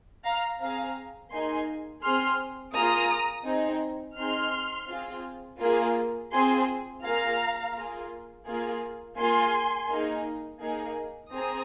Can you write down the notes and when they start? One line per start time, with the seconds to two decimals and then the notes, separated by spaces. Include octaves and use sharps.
0.24 F5 A#5
0.60 C4 G#4 F5 A#5
1.31 A#3 D#4 G#4 G#5 C6
2.02 C4 G#4 C6 F6
2.74 A#3 F4 G#4 A#5 D#6
3.45 C4 D#4 G#4
4.17 C4 D#4 G#4 C6 F6
4.89 C4 F4 G#4
5.60 A#3 F4 G#4
6.32 C4 F4 G#4 G#5 C6
7.03 A#3 F4 G#4 F5 A#5
7.75 A#3 F4 G#4
8.46 A#3 F4 G#4
9.17 A#3 F4 G#4 G#5 C6
9.89 A#3 D#4 G#4
10.61 A#3 D#4 G#4
11.32 C4 G#4 A#5 D#6